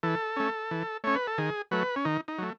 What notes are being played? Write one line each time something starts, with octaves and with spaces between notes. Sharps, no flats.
E3 A4
A3 C#4
E3
A3 C#4 C#5
B4
A4
D#3 G#4
F#3 A3 B4
C#4
D#3 D#4
D#4
F#3 A3